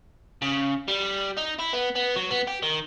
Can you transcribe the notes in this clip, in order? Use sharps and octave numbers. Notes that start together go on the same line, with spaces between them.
C#3
G3
D#4
E4
B3
B3
F#3
B3
G4
D#3